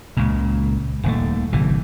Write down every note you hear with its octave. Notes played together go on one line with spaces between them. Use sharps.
C#2 A#2
D#1 D#2 A3
G1 C3 E3